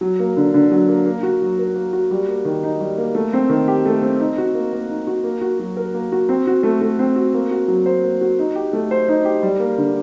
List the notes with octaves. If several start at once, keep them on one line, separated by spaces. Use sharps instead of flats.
F#3
A#3
D3
D3
F#3
A#3
A#3
F#4
F#3
A#4
A#3
F#4
G3
A#3
D#3
D#4
G3
A#3
A3
C4
D#3
G4
A3
C4
D#4
F#4
A#3
A#3
D#4
F#4
A#3
F#4
F#3
A#4
A#3
F#4
C4
F#4
A3
A3
C4
F#4
A#3
F#4
F#3
C5
A#3
F#4
D#4
G4
A3
C5
D#4
G4
G3
A#3
D3